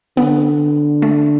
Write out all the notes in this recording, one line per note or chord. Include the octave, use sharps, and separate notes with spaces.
D3 B3
A3